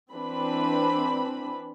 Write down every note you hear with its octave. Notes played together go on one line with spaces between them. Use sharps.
E3 C4 D4 B4 B5